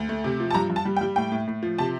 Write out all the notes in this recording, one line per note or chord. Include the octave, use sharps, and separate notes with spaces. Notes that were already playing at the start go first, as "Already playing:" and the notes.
Already playing: D2
A3
C3
F3
A5
G2 A#5
G2
A5
G3
G5
G3
A2 G5
A2
A2
F3
C3 A5